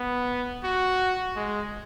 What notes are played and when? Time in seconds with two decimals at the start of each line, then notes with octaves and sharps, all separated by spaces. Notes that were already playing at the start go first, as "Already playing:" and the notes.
Already playing: B3
0.64 F#4
1.36 G#3